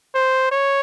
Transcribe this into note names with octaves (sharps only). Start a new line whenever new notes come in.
C5
C#5